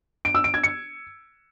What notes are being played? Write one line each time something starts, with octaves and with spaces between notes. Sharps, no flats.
D7
E6
D7
G#6
C#7